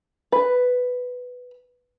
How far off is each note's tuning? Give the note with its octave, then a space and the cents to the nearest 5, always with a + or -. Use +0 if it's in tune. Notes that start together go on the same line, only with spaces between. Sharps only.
B4 +5